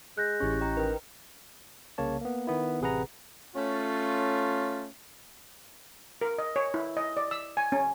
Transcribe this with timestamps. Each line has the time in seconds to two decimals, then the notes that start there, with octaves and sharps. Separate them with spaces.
0.17 G#3 F#6 G6 A#6
0.40 A1 C#4 E4 G4 C#6
0.61 D#5 G5 A#5
0.77 D#3 B4
1.98 C2 C#3 A#3 C#5 A5
2.21 A#3 B3
2.47 D#3 B3 E4
2.81 A1 C3 G#4 B4 F#5 A#5
3.56 A3 C#4 F4
6.21 A#4
6.38 D#5
6.56 C#5
6.74 E4
6.97 D#5
7.17 D5
7.31 E6
7.57 G#5
7.72 C#4